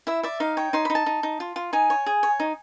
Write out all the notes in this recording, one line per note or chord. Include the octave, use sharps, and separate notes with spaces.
E4 E5
D5 E5
D#4 F5
C#5 G5
D#4 C6
B5
D#4
A5
D#4
D#4
F4
F4
D#4 G#5
C#5
G#4
C#5
D#4